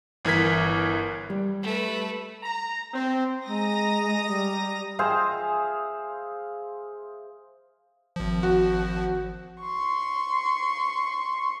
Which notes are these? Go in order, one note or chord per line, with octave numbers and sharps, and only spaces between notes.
G1 E3 A#4 G#6 B6
G3
A3 B4
A#5
C4
G#3 A#5 D#6 A#6
G3
G#4 C5 E5 F5
G#1 F3
F#4
C6 C#6